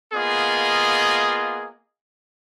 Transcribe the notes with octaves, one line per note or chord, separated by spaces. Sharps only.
A#3 B3 F4 G#4 D#5